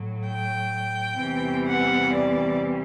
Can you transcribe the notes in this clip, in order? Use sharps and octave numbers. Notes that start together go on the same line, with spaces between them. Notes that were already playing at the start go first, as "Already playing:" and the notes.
Already playing: A2 F#3
G5
E2 C3 E3 G3
F#5
D5